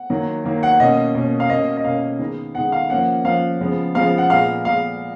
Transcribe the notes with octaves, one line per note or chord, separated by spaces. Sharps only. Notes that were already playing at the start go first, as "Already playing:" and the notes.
Already playing: F#5
D#3 F#3 A#3
D#3 F#3 A#3
F#5
B2 A#3 C#4 D#5
B2 A#3 C#4
F5
B2 A#3 C#4 D#5
D#5
B2 A#3 C#4 F5
D#3 G#3 B3
D#3 G#3 B3 F#5
F5
F3 A#3 C#4 F#5
F3 A#3 C#4 F5
C#3 F3 G#3 B3
C#3 F3 G#3 B3 F5
F#5
A#2 G#3 B3 F5
A#2 G#3 B3 F5